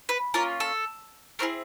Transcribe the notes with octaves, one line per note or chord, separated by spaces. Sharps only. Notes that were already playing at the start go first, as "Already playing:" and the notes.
B4
A#3 C#4 F4 A#4
A4
A3 C4 E4 G#4 A#4